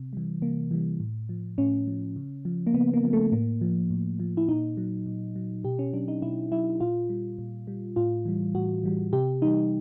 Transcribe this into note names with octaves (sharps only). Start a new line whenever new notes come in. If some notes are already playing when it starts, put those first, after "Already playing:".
Already playing: C3
E3 G3
C3 A#3
E3 G3
A2
F3
A2 C#4
F3
C#3
F3
A#3
C#3 B3
A#3
F3
A3
A2 A#3
F3
A2
F3
E4
A#2 D#4
F#3
A#2
F#3
B2 G4
C#4
F#3 D4
D#4
B2 E4
F#3 E4
A#2 F4
G3
A#2
G3
A2 F4
E3 G3
A2 F#4
E3 G3
C3 G4
E3 G3 D#4